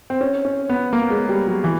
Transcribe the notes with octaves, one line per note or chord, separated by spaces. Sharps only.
C4
C#4
C#4
B3
A#3
G#3
G3
F#3
E3